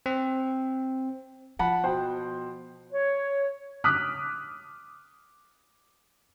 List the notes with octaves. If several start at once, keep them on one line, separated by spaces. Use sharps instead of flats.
C4
F3 F#5 A5 B5
B2 C5 G5
C#5
D6 D#6 F6 F#6 B6